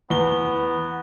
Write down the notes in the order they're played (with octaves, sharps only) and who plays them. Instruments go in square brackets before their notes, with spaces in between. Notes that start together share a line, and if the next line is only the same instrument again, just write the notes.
[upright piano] E2 G7 [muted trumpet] B3